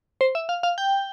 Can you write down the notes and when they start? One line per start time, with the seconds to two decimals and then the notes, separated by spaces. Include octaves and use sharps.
0.21 C5
0.35 E5
0.49 F5
0.63 F5
0.78 G5